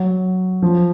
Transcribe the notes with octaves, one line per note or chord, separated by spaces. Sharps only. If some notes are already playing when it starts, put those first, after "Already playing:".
Already playing: F#3
F3